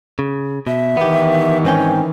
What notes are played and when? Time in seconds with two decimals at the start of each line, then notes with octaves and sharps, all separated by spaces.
0.19 C#3
0.67 B2 E5
0.97 D#3 E3 B3 G4
1.64 G#2 C4 C#4 G5